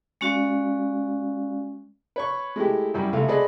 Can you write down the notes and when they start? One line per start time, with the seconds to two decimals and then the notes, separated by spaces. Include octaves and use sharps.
0.21 G#3 C#4 F#4 D5 F5
2.16 B4 C#5 C#6
2.56 G#3 A3 E4 G4
2.94 F#2 G3 E4
3.13 C#2 C3 A3 F5
3.28 G#4 A4 B4 C5 D5 D#5